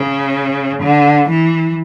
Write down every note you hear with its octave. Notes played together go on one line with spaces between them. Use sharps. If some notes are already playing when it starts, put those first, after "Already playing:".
Already playing: C#3
D3
E3